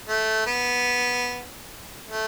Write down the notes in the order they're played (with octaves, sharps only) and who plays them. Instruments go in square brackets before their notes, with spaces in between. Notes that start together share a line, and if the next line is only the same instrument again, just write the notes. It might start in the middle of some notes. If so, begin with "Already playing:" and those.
[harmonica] A3
B3
A3